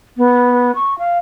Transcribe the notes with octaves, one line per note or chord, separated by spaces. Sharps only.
B3
C#6
F5